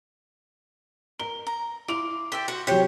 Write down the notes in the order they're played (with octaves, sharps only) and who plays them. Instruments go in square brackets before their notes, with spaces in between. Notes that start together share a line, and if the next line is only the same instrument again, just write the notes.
[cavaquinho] A#4 [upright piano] G7
[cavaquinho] A#5
[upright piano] E4 F7 [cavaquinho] F5 C6 D6
[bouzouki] G4 [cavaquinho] D5 E5 C6
[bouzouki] F#4 [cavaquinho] C6
[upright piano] C3 F#3 [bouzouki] G4 C#5 [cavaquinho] C5